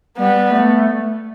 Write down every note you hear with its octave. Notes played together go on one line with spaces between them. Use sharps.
G3 B3
A3